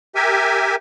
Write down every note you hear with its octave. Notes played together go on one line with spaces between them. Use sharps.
G4 A#4 E5 G#5